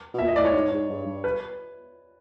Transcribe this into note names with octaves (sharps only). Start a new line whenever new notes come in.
B2
A#2 E5
D#5
A2 D5
C#5
G#2
G#2
G2
G2
B4